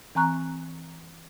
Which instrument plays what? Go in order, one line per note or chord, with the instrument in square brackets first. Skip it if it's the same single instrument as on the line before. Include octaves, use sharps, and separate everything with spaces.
[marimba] E3 C4 G#5 A#5 C#6 F#6